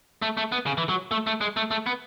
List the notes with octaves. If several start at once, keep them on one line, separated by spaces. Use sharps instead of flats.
A3
A3
B3
C#3
E3
F#3
A3
A3
G#3
A3
A3
B3